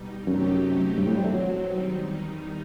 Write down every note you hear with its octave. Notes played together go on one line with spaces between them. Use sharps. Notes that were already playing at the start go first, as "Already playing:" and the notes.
Already playing: B2 G3 D#4
F#2 C3 F#3 A3 D#4 G4
G2 B2 F#3 C4
A2
G3
A3
F#3
E2 D#3 G3 D#4